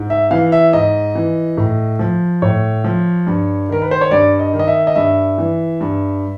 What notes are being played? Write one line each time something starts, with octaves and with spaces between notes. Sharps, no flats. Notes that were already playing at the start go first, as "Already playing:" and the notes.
Already playing: G#2
E5
E3 F5
E5
G#2 D#5
E3
A2
F3
A2 C#5
F3
G2
D#3 A#4
B4
C5
C#5
G2 D5
D#5
D#3
D#5
E5
D#5
G2 E5
E3
G2